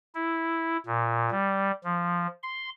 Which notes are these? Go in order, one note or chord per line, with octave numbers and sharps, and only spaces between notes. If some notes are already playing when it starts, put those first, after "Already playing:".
E4
A#2
G3
F3
C6